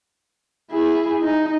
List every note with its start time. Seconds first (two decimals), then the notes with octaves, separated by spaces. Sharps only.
0.71 E4 G#4
1.23 D#4